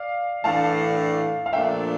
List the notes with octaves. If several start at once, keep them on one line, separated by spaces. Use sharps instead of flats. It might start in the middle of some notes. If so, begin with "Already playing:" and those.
Already playing: D5 F5
A2 E3 A3 D4 F5 A5
F5
A#2 F3 A3 D4 E5 G5